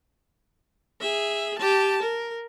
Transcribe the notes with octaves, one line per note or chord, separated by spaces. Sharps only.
G#4 E5
G4 A5
A#4